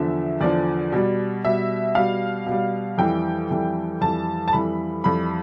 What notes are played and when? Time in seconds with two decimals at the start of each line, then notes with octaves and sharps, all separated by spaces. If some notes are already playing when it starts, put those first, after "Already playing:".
Already playing: E2 D3 F3 E5
0.41 E2 D3 F3 D5
0.92 B2 G3
1.44 B2 G3 E5
1.95 B2 G3 F5
2.46 B2 G3
2.98 F2 E3 G3 G5
3.50 F2 E3 G3
4.01 F2 E3 G3 A5
4.48 A5
4.53 F2 E3 G3 B5
5.04 F2 E3 G3 B5